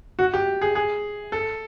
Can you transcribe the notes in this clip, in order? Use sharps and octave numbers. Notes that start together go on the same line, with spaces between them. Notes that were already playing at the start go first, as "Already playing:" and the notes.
F#4
G4
G#4
G#4
A4